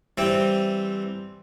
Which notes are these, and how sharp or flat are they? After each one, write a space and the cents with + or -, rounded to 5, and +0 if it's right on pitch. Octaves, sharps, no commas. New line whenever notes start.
E3 +5 G3 +0 C4 +0